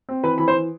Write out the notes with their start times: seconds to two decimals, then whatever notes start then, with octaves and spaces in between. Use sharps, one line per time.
0.09 C4
0.23 E3 B4 B5
0.38 E3 B5
0.48 C5 C6
0.55 E3